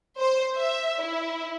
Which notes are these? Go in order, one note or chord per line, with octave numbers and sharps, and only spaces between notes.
C5
E5
E4